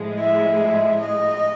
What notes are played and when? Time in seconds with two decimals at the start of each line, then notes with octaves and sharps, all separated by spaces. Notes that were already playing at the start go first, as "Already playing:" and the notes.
Already playing: A2 F3 G#3
0.19 E5
0.60 E5
1.01 D#5